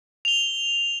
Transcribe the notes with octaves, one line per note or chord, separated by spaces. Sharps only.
F7 G7